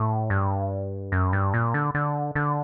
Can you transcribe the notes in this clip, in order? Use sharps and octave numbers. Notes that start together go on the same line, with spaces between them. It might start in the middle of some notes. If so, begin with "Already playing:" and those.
Already playing: A2
G2
F#2
G2
A#2
D3
D3
D3